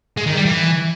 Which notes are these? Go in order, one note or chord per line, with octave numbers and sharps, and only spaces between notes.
G#3
D#3
G3
E3